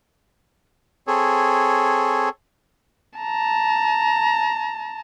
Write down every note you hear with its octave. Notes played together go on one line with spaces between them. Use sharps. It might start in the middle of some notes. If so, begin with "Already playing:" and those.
C4 G#4 A4 C#5
A5 A#5